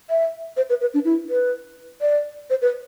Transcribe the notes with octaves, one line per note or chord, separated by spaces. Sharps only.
E5
C5
B4
B4
D4
E4
B4
D5
C5
B4